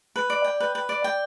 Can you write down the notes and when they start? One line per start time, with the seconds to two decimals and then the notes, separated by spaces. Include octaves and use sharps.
0.16 B4
0.30 D5
0.44 G5
0.60 B4
0.75 B4
0.89 D5
1.04 G5